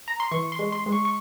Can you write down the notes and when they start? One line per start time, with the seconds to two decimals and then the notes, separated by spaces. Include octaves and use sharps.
0.08 A#5
0.20 C6
0.32 E3 C#6
0.52 C6
0.59 G#3
0.72 C6
0.86 G#3
0.92 C#6
1.05 C#6